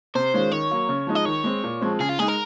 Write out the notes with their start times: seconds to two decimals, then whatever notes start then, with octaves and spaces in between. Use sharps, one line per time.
0.15 C3 C5
0.34 D#3 G#3 C#4 F4
0.52 D#3 C#5
0.71 F#3 A#3
0.89 C#3
1.07 F3 G#3 D#4
1.15 D#5
1.25 D#3 C#5
1.44 G#3 C4
1.64 A#2
1.81 F3 G#3 C4
2.00 C#3 G#4
2.09 F4
2.19 G#3 D#4 G#4
2.28 A#4